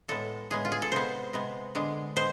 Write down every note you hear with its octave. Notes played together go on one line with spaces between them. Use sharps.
A2 G#3 B3 A4
A2 G#3 B3 G#4
F4
G#4
A4
C3 G#3 B3 C5
C3 G#3 B3
D3 G#3 B3
G#3 B3 C5